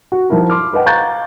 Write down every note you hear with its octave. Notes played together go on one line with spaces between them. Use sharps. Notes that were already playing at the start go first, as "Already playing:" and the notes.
F#4
F3 D#4 E4 A#4
C6 D6 F6
B4 D#5 F#5 G5
F5 A#5 C#6 F#6 G6 A6